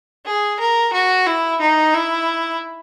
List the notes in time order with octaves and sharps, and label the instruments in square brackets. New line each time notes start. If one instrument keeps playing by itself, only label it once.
[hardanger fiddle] G#4
A#4
F#4
E4
D#4
E4